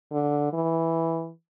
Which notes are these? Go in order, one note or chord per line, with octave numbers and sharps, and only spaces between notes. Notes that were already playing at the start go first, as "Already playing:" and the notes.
D3
E3